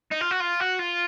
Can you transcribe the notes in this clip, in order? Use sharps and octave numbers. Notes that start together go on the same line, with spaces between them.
D#4
F4
F#4
F4
F#4
F4